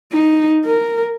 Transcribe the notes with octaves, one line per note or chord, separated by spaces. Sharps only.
D#4
A#4